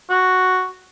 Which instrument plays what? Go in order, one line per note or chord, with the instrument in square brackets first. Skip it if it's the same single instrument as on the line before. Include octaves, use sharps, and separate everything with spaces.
[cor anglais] F#4